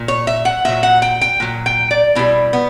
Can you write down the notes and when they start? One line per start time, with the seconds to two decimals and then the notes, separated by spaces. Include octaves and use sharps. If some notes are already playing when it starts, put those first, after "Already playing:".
Already playing: A#2
0.08 C#5
0.27 E5
0.45 F#5
0.65 A#2 F#3 E5
0.83 F#5
1.02 G5
1.21 G5
1.40 A#2 F#3
1.66 G5
1.91 D5
2.15 B2 G3 E4
2.53 B3